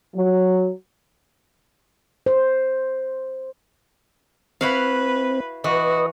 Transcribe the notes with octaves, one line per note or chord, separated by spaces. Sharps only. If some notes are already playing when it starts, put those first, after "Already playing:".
F#3
C5
C4 E4 F#4 B4 F5
E3 F#4 B4 D#5